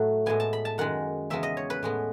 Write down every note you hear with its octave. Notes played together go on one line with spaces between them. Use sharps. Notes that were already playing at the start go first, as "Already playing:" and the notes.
Already playing: A2 F#3 A3 F#5
A2 G#3 B3 G#5
A5
B5
A5
F#2 D#3 G#3 F#5
E2 C#3 G#3 B3 E5
D#5
C#5
B4
A2 G#3 B3